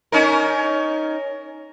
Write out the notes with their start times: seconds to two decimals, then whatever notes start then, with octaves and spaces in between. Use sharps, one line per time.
0.12 C#4 D#4 A#4